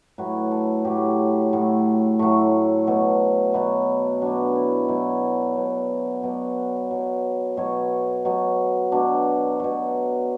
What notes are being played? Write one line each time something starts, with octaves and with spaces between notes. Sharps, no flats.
A2 F#3 B4
A4
A2 F#3 G4
A2 F#3
A2 F#3 A3
B2 F#3
B2 F#3 B3
B2 F#3 D4
E4
B2 F#3 E4
B2 F#3
B2 F#3 D5
B2 F#3
B2 F#3 C#5
B2 F#3
B2 F#3 D4
B2 F#3